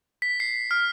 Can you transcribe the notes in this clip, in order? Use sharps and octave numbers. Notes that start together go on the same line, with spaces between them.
B6
C7
F6